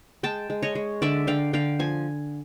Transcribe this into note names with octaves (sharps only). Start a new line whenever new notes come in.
G#3 G5 A5
G#3
C#5 D#5
G#3
D3 D5 E5
D3 F5 G5
D3 F5 G5
F3 G#5